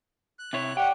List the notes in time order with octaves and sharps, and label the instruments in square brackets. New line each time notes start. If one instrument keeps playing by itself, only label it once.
[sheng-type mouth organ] F#6
[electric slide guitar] C3 E4 C#5
[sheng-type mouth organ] G4 F#5 [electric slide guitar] D5 G5